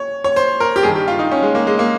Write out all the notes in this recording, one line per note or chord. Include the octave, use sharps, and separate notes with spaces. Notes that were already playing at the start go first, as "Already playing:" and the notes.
Already playing: C#5
C#5
C5
A#4
G4
G2 D#3 G#4
G4
F4
D#4
C#4
G#3
A#3
G#3
A#3